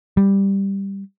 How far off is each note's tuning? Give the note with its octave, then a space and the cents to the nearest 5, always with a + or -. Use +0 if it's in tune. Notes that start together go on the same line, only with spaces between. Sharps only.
G3 +5